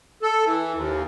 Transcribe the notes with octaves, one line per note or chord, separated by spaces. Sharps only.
A4
E3
D#2